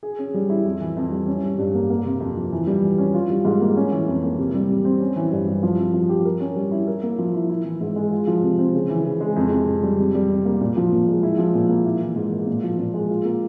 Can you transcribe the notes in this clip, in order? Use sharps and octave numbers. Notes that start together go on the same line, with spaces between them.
G#4
C#4
G3
E4
F2
E3
F2
G3
C#4
G3
G2
A#3
A#3
C3
F2
F3
E3
G3
E3
C#4
F4
G3
G#2
A#3
C#4
E3
F2
A#3
C3
G3
C3
C4
C#4
E3
G2
G3
F3
C4
F3
G4
A#4
C#4
G3
E4
A#4
A#3
F3
E4
E4
E3
G#2
G#3
F4
F3
C3
C4
C#3
E3
C#3
G#3
F2
C3
F2
G3
C3
G3
C3
A#3
A#2
F3
A#2
G#3
E4
F3
A#2
A#3
E4
E3
G#2
A#3
A#2
F3
A#2
G#3
F4
A#3